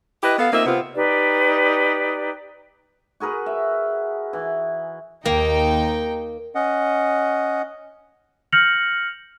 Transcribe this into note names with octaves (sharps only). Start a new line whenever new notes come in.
E4 G4 B4 D#5
B3 A4 F5
A#3 C4 D#4 F4 E5
C3 B3 C4 F4
D#4 G4 B4 D5
F#4 G#4 A#4 B4
E5
E3
D#2 A#3 D#4 G5
C#4 D#5 F#5
F6 G6 A#6 C#7 F7 F#7